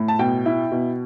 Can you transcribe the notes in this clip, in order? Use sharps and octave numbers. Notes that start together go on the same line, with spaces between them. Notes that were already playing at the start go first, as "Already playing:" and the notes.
Already playing: A2
A5
B2 G5
E4
B2